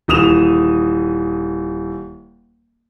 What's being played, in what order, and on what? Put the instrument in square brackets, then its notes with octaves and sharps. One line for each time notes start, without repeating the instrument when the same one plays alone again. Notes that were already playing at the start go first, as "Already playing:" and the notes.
[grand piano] D#1 E3 D#6 E7 F7